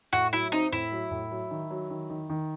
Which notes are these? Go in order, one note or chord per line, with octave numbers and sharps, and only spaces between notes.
A2 F#4
F#3 E4
C4 D#4
A2 E4
F#3
A2
F#3
D#3
F#3
D#3
D#3
D#3